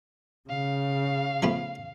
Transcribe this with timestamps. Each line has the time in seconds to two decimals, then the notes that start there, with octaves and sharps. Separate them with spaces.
0.49 C#3 F5
1.43 F3 A3 B3